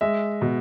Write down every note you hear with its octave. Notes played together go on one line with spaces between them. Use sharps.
G#3 E5
B2